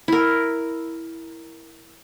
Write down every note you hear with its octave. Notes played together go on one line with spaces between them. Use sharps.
E4 A#4